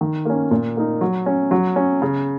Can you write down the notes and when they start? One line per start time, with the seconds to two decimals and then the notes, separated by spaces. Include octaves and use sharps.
0.01 D#3
0.25 A#3 C#4
0.51 A#2
0.77 A#3 D#4
1.01 F#3
1.26 C#4
1.51 F#3
1.76 C#4
2.02 C#3